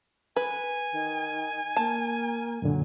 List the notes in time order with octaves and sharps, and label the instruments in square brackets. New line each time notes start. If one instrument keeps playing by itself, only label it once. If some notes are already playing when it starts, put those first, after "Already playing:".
[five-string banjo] B4 [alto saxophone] G#5
[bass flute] D#3
[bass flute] A#3 [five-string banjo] A5
[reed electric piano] F#2 A#2 D3 [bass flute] F#3